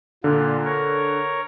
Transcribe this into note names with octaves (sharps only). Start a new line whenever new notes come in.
A#2 D3 A#3
A#4 C#5